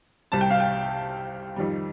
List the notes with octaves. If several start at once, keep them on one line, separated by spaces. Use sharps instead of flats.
C2 C3 G3 A5
G5
F5
G5
F2 D#3 G3